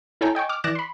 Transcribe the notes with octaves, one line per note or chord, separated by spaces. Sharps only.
E4 A4 C#5 G5 G#5 A#5
D#5 G5 G#5 C#6
D6 F6
E3 D5 D6 F#6 A#6 E7
B5 C6